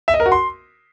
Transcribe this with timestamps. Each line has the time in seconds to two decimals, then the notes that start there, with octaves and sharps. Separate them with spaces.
0.08 E5
0.14 D#5
0.20 A#4
0.26 F#4
0.32 C6